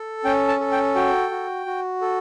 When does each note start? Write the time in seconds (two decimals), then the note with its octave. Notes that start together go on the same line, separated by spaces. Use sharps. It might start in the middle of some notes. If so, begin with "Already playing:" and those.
Already playing: A4
0.25 C#4 G5
0.48 A5
0.60 A4
0.72 G5
0.95 F#4 G5
1.31 F#4
1.66 F#4
2.01 A4